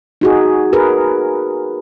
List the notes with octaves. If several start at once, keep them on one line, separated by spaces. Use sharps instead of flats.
D#4 F#4 G#4
G#4 A#4 B4